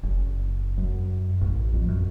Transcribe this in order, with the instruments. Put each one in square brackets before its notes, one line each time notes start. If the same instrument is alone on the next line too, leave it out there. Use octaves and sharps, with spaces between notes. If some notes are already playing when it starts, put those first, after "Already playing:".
[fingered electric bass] F#1
F#2
A1
F2
F#2